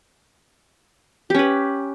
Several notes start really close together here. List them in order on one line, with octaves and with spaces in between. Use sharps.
G4 C#4 B4